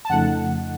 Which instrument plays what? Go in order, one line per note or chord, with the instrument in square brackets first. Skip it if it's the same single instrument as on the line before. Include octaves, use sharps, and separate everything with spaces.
[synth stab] A5
[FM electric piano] F2 C#3 F3 A3 D#4 [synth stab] F#5